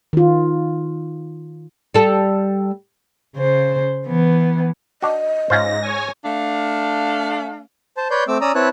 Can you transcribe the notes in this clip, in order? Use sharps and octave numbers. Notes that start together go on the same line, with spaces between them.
D#3 F4
G3 A4
C#3 C5
E3 B3
D4 F#4 D#5
G#2 C#4 F4 C5 A#6
C#5 G#5
A3 D4 F5
C5 A5
B4 C#5 D5 C6 G6
A3 C4 D6 E6
C#4 D5 A#5 D#6 E6
C4 E4 B4 C#5 A5 F#6